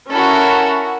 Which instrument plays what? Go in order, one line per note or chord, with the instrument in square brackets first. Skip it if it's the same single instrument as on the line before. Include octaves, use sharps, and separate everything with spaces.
[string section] C#4 E4 F#4 [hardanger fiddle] A4 A#4